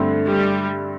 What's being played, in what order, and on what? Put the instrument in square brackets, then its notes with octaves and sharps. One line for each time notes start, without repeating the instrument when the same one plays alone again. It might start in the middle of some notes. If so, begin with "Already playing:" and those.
Already playing: [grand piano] G2 D3 A3 C4
[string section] G3